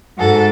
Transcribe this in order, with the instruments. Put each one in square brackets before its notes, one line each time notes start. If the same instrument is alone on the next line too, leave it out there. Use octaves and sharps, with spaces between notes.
[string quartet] G#2 F#4 A4